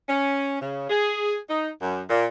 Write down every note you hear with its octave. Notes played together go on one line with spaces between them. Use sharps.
C#4
C#3
G#4
D#4
F#2
A#2